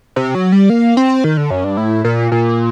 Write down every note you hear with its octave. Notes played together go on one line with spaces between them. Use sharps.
C3
F#3
G3
A#3
C4
D#3
D3
F#2
G2
A2
A#2
A#2